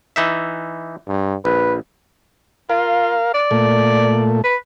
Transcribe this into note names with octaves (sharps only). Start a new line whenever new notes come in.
E3 D#4 E5
G2
A#1 B4
F4 A#4 F5
D5
A#2 A3
B4